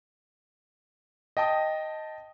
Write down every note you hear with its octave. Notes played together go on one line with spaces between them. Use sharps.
D#5 G5 A5 D#6